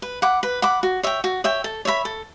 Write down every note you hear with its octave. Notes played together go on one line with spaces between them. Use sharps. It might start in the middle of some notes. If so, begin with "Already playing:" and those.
B4
F#5 B5 D6
B4
F#5 B5 D6
F#4
C#5 E5 G5
F#4
C#5 E5 G5
A4
C#5 E5 B5
A4